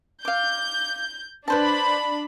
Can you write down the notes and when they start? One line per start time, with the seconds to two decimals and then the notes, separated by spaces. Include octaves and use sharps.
0.25 F5 D6 G6
1.48 D4 B4 C5 A5 B5